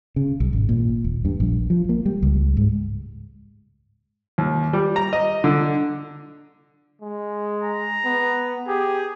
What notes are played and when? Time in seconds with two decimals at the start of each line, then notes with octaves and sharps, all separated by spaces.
0.16 C#3
0.40 B1
0.53 G#1
0.69 A#2
1.04 D#1
1.25 G2
1.40 A#1
1.70 F3
1.89 A#3
2.06 G3
2.22 C#2
2.57 G#2
4.38 D#2
4.73 G3
4.96 A#5
5.13 D#5
5.44 D3
7.02 G#3
7.63 A#5
8.05 B3
8.68 G4 G#4